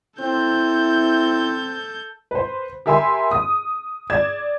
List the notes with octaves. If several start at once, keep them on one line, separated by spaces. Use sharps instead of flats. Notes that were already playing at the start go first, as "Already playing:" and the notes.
C4 E4 A4 G6
B4 C5
G4 A#4 E5 G#5 B5 C6
D#6
D5 G#6 E7